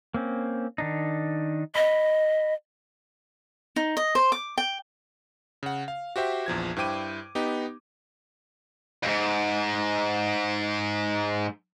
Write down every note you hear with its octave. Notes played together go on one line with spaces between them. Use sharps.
A#3 C4 C#4
D#3 D4 D#4
D#5 B5
D#4
D#5
C5
D6
G5
C#3 F#5
F5
F#4 G4 C5 E5 G5
A#1 E2 F3 G#6
G2 E4 C5 G5 D6 D#7
B3 D#4 G4
F2 G#2